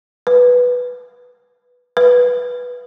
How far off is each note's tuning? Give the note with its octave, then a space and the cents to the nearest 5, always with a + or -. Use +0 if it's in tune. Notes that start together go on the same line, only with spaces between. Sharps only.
B4 -5
B4 -10